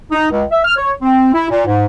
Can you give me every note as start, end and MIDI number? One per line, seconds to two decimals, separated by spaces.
0.12 0.28 63
0.31 0.44 37
0.52 0.60 76
0.65 0.75 89
0.77 0.92 73
1.01 1.31 60
1.34 1.48 64
1.50 1.65 46
1.67 1.85 44